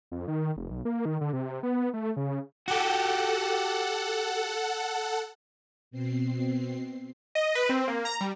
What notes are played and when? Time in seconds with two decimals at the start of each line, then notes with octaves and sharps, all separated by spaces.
0.12 F2
0.28 D#3
0.57 F1
0.71 B1
0.85 A#3
1.05 D#3
1.21 D3
1.33 C3
1.63 B3
1.94 A3
2.17 C#3
2.68 F#4 G4 A4 F#5
5.91 B2 C4 C7
7.35 D#5
7.55 B4
7.69 C4
7.88 A#3
8.05 A#5
8.21 G3